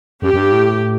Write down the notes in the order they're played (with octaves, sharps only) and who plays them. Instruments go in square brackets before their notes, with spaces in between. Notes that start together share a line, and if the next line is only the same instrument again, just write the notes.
[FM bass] F#2 [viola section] G4
[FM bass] F#2
G2
A2